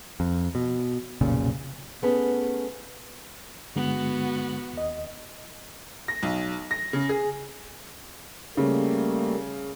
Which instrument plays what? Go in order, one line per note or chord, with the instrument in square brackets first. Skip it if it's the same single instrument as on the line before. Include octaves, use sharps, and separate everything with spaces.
[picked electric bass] F2
B2
F1 B1 A#2 C#3
[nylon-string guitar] A3 B3 C#4 G#4
[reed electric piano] G2 D3 G#3 [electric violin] B3 F#4
[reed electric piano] D#2 D#5
[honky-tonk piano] A#6
B1
A#6
C#3
G#4
[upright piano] C#3 [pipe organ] G3 A3 A#3